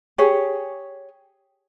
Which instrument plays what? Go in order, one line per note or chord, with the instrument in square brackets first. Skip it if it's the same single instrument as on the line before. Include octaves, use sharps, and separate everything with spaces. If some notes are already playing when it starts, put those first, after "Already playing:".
[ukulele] G4 G#4 C#5